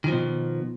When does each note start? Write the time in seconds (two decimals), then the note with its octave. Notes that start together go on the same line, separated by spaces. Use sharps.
0.04 D#3
0.08 F3
0.12 B2